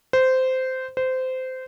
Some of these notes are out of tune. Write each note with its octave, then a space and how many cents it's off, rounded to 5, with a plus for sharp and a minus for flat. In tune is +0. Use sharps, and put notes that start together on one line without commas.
C5 -15
C5 -20